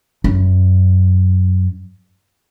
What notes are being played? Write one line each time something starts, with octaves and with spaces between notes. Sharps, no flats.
F#2